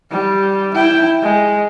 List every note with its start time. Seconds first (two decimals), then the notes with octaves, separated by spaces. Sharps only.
0.11 G3
0.74 E4 G5
1.22 G#3